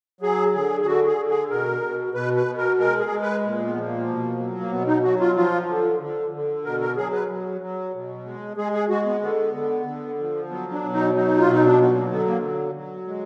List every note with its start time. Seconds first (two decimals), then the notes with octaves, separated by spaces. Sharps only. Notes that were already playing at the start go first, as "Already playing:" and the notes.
0.21 F#3 G#4
0.54 D3 G#4
0.82 G#4
0.85 D3 F#4
1.07 G#4
1.18 D3
1.29 G#4
1.50 B2 A#4
1.82 B2
2.14 B2 B4
2.36 B4
2.46 B2
2.58 A#4
2.79 G#3 A#4
3.00 G#4
3.10 G#3
3.22 B4
3.43 A#2
3.65 B3
3.75 F3
3.86 A#3
4.07 B2
4.40 F#3
4.60 A#3
4.72 B2 B3
4.87 D#4
5.03 F#3 F#4
5.20 F4
5.36 F3 F4
5.69 D3
6.00 D3
6.33 D3
6.65 B2 A#4
6.80 A#4
6.97 F#3 G#4
7.13 B4
7.29 F#3
7.61 F#3
7.94 B2
8.25 G#3
8.57 G#3 G#4
8.73 G#4
8.89 G#3 F#4
9.06 B3
9.21 D3 B3
9.54 D3
9.86 D3
10.18 F3
10.50 F#3 B3
10.72 D4
10.82 B2
10.94 D#4
11.15 F#3 D#4
11.38 F4
11.46 B2
11.51 D#4
11.65 D4
11.79 F#3 B3
11.95 A#3
12.11 D3 B3
12.27 A#3
12.43 F#3
12.75 F#3
13.08 G#3